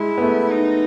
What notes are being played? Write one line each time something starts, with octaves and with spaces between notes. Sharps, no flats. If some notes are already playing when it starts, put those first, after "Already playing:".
Already playing: G#3 E4
B3
A3
D#4